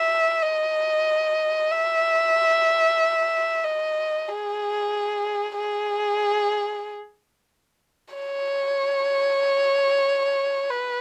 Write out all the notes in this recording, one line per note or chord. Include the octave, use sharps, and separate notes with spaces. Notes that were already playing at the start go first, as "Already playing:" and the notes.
Already playing: E5
D#5
E5
D#5
G#4
G#4
C#5
B4